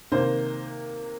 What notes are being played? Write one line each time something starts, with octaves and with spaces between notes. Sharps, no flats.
C3 D#3 A#3 C5